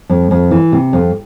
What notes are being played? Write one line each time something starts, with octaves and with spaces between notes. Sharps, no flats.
F2
F2
E3
C3
F2